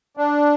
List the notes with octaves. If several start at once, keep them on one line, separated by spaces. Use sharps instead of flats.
D4